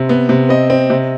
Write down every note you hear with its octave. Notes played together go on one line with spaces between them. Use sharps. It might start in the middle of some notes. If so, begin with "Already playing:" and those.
Already playing: C3
B3
C3
C4 D#5
C4
C3